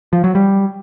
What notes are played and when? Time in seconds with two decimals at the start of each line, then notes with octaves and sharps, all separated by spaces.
0.13 F3
0.24 F#3
0.35 G3